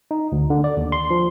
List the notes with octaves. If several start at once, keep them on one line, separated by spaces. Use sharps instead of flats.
D#4
D2
D3
D5
D#2
C6
F3